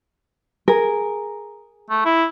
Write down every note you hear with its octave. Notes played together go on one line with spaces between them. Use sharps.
G#4 A#4
A3
E4